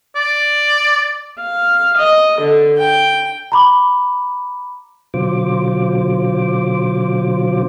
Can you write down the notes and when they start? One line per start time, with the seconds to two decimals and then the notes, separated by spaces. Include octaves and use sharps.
0.16 D5
1.41 F5
1.97 D#5
2.40 D3
2.78 G5
3.52 A#5 B5 D6
5.14 B2 D3 F#3 F4 C5 D6